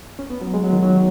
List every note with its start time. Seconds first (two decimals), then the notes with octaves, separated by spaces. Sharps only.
0.19 C#4
0.30 B3
0.41 F#3
0.54 G#3
0.64 F#3
0.73 D#3
0.83 F#3